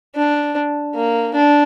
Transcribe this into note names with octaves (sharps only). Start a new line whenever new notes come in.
D4
A#3
D4